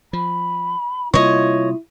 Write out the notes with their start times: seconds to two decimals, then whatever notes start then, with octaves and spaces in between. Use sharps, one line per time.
0.13 F3 B5
1.14 C3 G3 A#3 E4 F4 C#5 D#5